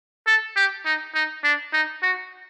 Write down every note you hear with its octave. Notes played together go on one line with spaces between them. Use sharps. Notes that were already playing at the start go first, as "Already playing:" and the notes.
A4
G4
D#4
D#4
D4
D#4
F#4